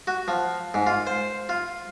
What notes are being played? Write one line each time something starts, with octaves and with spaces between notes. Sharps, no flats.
F#4
F3
G#2
F4
C5
F4